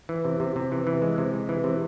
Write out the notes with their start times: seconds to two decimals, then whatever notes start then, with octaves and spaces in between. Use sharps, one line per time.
0.09 E3
0.25 C3
0.40 C3
0.56 C3
0.72 E3
0.87 E3
1.02 G#3
1.18 C3
1.34 G#3
1.49 E3
1.64 C3